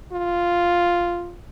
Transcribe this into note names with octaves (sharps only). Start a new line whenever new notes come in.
F4